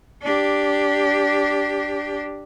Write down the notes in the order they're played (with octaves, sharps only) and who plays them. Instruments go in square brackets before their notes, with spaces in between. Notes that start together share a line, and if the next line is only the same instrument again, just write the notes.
[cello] D4 G4